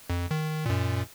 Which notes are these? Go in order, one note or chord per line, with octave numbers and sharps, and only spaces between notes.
F2
D#3
F#2 A#2